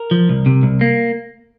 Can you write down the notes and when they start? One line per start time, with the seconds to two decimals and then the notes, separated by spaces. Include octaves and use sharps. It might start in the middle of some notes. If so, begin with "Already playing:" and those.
Already playing: A#4
0.11 F3
0.29 C2
0.46 C3
0.63 C2
0.81 A#3